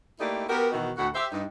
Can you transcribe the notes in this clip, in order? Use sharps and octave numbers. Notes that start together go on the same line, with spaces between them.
A3 A#3 D#4 E4 G4 D5
B3 F#4 G4 A#4
B2 D#3 E3 D#4 F#4
D2 A2 E4 F#4 F#5
G4 C5 E5
G2 D#4